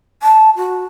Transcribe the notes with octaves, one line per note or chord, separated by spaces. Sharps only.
A5
F#4